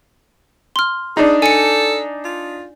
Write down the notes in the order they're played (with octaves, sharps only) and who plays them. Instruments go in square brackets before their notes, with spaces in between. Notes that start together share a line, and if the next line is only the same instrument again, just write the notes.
[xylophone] C6 F6
[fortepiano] D4 D#4 [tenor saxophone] G#4
[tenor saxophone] A4 [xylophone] G#5 C#7
[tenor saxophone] F4